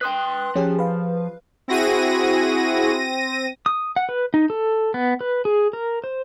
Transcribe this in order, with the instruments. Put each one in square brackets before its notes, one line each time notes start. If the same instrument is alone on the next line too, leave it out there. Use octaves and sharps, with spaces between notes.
[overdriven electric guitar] B4 G5 [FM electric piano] C6 D#6 F#6
[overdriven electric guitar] F3 [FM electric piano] C#4 G4 G#4
[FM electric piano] B4 F5
[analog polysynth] C4 A#6 D#7 [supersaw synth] E4 F#4 G#4
[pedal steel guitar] D#6
F#5
B4
D#4
A4
B3
B4
G#4
A#4
C5